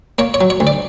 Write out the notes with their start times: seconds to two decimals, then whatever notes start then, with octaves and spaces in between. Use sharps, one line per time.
0.19 A#3 C#5
0.34 C#5
0.41 F#3
0.50 C#5
0.60 D2
0.67 D5